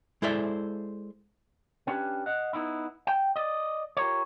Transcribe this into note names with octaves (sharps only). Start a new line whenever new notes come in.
G#3 E4 A4 C5 D5 E5
B3 C#4 D4 F#4 G4 B4
D#5 F#5
B3 D#4 E4
G5
D5 D#5
F4 G4 A#4 C#5